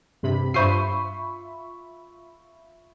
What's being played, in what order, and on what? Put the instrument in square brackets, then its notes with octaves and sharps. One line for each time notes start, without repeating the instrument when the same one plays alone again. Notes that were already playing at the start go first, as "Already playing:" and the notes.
[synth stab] G2 C3 B5
[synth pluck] G2 C5 C7 [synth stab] F4 E5 [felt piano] B5 C#6 D#7